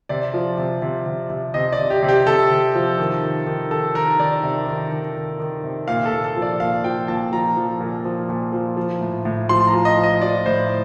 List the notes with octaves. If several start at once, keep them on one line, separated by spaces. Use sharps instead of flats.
C3 D5
F3
C3
C3
C3
C3
C3 D#5
D5
C3
G4
C3
G4
C3 A4
C3
F3
D#3
D#3
D#3
D#3 A4
D#3 A#4
D#3 D5
C3
D#3
D#3
D#3
D#3
C3
A#2 F5
A4
A#2
A4
F3
D5
A#2 F5
F3 G5
A#2 A5
F3 A#5
F3
A#2
F3
A#2
F3
F3
A2
A2
F3 C6
A#5
F3
D#5
F3
D#5
F3 D5
A2 C5